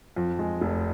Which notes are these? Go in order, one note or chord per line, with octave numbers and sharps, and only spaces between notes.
F2
G#3
F1